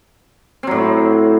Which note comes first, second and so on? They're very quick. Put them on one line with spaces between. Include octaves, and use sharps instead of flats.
C4 F#3 A2